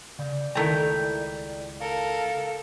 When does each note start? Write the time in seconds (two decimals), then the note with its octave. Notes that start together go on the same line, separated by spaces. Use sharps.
0.19 C#3 D5
0.55 C#2 D#3 A3 E4 G5 A#5
1.80 A4 A#4 F5